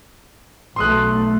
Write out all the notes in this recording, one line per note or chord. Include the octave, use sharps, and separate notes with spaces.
B1 A3 C6 D#6 F#6